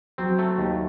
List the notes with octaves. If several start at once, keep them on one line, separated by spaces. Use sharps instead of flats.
F#3 C4
A3
D#2